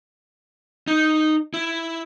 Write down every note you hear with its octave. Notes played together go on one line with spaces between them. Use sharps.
D#4
E4